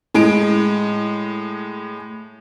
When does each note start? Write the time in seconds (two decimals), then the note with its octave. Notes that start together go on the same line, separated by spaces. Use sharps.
0.15 A2 G#3 D7